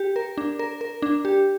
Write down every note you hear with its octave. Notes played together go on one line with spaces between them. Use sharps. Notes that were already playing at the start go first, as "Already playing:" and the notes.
Already playing: G4
A#4
D4
A#4
A#4
D4
G4